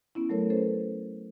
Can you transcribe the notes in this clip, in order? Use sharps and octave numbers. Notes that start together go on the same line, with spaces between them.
B3 C#4 E4
F#3 A3 A4 A#4 C#5
C#4 A4 B4 C5